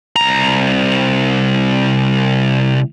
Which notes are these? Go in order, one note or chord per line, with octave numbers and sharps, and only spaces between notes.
C2 A#5